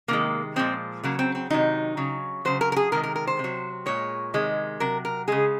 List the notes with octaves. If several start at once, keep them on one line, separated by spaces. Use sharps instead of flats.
C3 D#3 G#3 A#3
A#2 F3 G#3 C4
C#3 F#3 A#3
C4
C4
C3 D#3 F#3 D#4
C#3 F#3
C#3 F#3 C5
A#4
A#4
G#4
C3 D#3 G#3 A#4
A#4
A#4
C5
C3
F#3
A#2 G#3 C#5
C3 D#3 G#3
C3 F#3 A#4
A#4
C#3 G#3 G#4